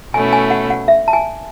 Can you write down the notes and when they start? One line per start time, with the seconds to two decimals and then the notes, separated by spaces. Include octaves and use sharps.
0.14 B2 A3 C#4 E4 G#5
0.33 G#5
0.50 F#5
0.70 F#5
0.88 E5
1.08 A5
1.13 G#5